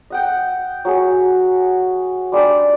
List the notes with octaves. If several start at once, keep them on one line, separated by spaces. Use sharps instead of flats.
D#5 F#5 G5
F#3 G#4
G3 G#3 D4 D#4